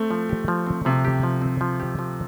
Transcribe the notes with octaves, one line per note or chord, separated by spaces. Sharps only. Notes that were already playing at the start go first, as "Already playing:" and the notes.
Already playing: A3 C4
F3
G4
F3
C4
C3 F3
G4
F3
C4
F3
G4
F3